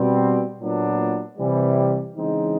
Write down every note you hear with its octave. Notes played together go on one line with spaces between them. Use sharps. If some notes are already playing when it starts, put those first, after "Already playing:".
Already playing: B2 G3 C4
A#2 F#3 B3 D4
C3 E3 G3
C#3 E3 G#3 C4 D#4